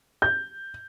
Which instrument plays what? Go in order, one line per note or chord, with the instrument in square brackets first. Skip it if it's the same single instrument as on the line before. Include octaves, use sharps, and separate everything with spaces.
[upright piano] G6